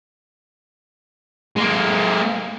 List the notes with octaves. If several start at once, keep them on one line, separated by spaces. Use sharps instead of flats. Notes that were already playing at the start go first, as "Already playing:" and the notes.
G#3 A#3